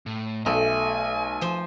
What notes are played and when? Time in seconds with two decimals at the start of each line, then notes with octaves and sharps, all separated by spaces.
0.06 A2
0.46 B1 A3 G#5
1.41 F3 C5